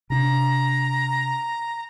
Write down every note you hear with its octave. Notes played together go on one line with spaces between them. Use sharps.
C3 D4 A#5